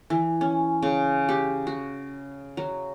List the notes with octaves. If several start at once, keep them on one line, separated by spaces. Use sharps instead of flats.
E3
C#4
C#3
G4
F#4
F#3